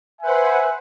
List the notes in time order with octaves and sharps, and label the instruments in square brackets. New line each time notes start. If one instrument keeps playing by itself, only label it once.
[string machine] B4 C5 F#5 [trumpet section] E5 G#5